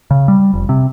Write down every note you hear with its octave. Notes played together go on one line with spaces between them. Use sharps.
C#3
G3
F1
C3